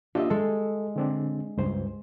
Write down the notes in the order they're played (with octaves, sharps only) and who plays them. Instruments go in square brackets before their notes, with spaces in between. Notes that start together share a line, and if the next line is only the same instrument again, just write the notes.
[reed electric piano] A#3 D4 F4 [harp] G4 D#5 E5
[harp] G#3 [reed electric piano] A4
[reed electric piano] D3 C4 D4
C#2 G2 C5